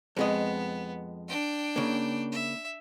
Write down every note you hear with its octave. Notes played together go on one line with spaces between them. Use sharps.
F2 G#3 B3 D#5
D4 G5
C#3 A#3
E5